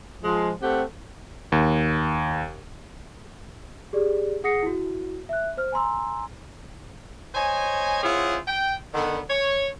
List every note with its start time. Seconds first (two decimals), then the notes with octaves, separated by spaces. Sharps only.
0.23 F3 G#3
0.62 A3 C4 G4 F#5
1.52 D#2
3.93 G4 G#4 D5
4.44 G#4 F#5 D#6 A#6 C7 C#7
4.63 E4 F#4
5.29 E5 F#6
5.57 C5 F6
5.72 G#5 A#5 C6 E6
7.35 C5 C#5 D#5 G#5
8.03 C#4 E4 F4 G#4 C5 F#5
8.47 G5
8.94 D3 D#3 B3
9.30 C#5